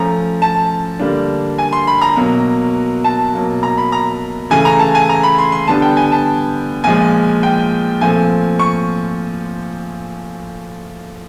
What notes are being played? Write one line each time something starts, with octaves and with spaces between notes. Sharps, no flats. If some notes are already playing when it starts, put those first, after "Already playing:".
Already playing: F3 A3 C#4 A#5
A5
D3 G3 A#3 D4
G#5
C6
B5
A#5
B2 F#3 A#3
A5
B2 F#3 A#3
A#5
B5
A#5
C#3 E3 A3 G#5
A#5
A5
G#5
A#5
B5
C6
C6
D3 G3 B3 D4 A5
G5
G#5
A5
A#2 F3 G#3 G#5
G5
A#2 F3 A3 C4 G#5
C#6